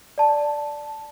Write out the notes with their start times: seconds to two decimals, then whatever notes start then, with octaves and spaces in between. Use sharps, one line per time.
0.18 D5 A5